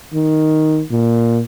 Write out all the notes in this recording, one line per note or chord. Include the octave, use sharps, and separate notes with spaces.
D#3
A#2